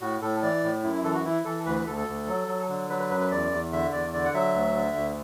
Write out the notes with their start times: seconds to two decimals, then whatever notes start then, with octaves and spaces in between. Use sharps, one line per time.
0.01 A2 F#4
0.22 A2 A4
0.42 E3 D5
0.64 A2
0.83 F#2 E4
0.94 E4
1.04 E3 A4
1.14 F#4
1.25 E3 E4
1.45 E3 A4
1.66 D2 B4
1.76 B4
1.86 D2 A4
1.97 A4
2.07 D2
2.27 F#3
2.48 F#3
2.69 D3
2.89 F#3 B4
3.00 B4
3.10 F#2 B4
3.21 B4
3.31 E2 D5
3.52 E2
3.72 D3 E5
3.93 E2 D5
4.13 D3 D5
4.25 F#5
4.34 F#3 E5
4.54 D2
4.76 D3
4.96 D2